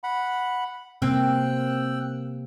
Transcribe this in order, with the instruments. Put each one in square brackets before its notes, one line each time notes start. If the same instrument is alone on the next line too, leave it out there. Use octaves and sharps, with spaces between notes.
[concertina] F#5 B5
[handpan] C3 A#3 [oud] C4 [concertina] G5 E6 F#6